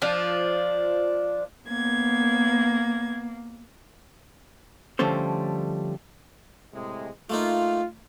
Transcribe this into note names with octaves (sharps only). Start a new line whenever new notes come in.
F3 D4
A#3 B3 G#6
D3 F3 G3 A3 C#4 C5
A2 C3 G#3
A3 A#3 D#4 F4